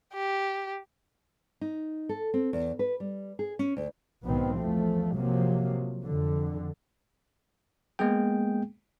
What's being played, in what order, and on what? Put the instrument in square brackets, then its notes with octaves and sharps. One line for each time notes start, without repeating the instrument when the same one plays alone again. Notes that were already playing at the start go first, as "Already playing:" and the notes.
[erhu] G4
[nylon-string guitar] D#4
A4
C4
E2
B4
G3
G#4
C#4
D2
[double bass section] B1 G#2 D#3 B3 C4
E2 F3 A3
C3 F3 F#3 A#3
F2 D3
[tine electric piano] G#3 A#3 B3 G#4 G5